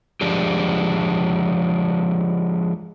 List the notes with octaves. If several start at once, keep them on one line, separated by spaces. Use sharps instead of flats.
F3 G#3 D4 G4